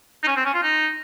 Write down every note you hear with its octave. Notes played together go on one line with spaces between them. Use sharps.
D#4
C#4
C4
C#4
F4
D#4